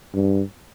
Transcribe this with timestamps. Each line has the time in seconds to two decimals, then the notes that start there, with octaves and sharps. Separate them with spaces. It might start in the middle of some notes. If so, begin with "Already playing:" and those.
0.13 G2